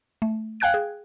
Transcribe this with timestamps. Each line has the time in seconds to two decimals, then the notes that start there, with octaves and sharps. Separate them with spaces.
0.22 A3
0.60 F5 G5 G#5 F#6 G#6 D7
0.74 G#4